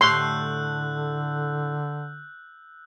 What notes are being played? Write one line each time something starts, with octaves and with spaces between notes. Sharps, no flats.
A2 D3 G4 C#5 C6 E6 F#6 G6